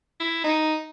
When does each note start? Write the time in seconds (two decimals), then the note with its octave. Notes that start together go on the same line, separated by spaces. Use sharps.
0.20 E4
0.44 D#4